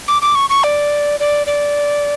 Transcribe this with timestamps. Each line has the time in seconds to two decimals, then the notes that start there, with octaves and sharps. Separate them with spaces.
0.08 D6
0.22 D6
0.35 C#6
0.50 C#6
0.63 D5
1.20 D5
1.47 D5